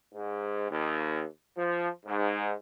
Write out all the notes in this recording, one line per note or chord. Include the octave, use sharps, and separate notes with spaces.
G#2
D#2
F3
G#2